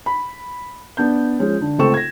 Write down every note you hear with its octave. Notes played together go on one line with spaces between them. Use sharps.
B5
B3 D4 G6
F3 G#3 C#4
D3
C#2 A3 C4 A4 C#6 E7
G#6 A#6